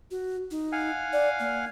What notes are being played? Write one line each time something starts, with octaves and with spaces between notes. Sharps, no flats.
F#4
D#4
F5 F#5 G#5
D5
A#3